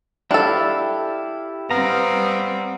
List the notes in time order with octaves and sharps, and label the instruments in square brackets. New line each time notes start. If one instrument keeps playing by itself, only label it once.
[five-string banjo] D4 A4 [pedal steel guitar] E4 G4 F5
[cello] G3 C4 [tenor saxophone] B3 [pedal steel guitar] F5 A#5